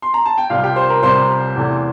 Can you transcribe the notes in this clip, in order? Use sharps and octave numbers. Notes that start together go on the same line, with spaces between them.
C6
A#5
A5
G5
C2 C3 G3 F4 F5
G4 G5
C5 C6
A#4 A#5
C2 C3 G3 C5 C6
E2 C3 E3 A3